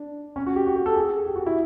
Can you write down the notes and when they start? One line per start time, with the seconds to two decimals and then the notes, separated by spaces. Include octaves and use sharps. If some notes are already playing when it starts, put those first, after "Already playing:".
Already playing: D4
0.36 C#4
0.46 F#4
0.56 G4
0.66 F#4
0.76 G4
0.86 A4
0.96 G#4
1.26 G4
1.36 F#4
1.46 E4